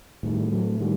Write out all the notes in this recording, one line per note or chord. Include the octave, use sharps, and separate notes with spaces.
A2 D#3 G3
F#3 A3
D#3 G3